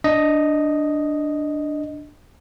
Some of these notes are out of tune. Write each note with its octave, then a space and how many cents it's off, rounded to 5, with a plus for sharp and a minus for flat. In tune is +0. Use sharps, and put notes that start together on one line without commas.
D4 +5 D#5 +0